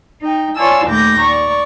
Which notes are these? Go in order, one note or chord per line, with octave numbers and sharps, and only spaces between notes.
D#4 G5
F4 C#5 D5 G#5 A5 E6
D#2 A#2 A3 D6 G6 A#6
D5 A#5 C#6